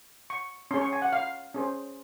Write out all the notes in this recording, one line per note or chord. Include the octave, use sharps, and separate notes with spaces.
C#6
C#4 G#4 C#5 C6
C#6
G#5
F#5
F5
C#4 G#4 C5